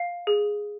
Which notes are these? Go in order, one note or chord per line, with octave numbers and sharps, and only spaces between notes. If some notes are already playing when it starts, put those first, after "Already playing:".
Already playing: F5
G#4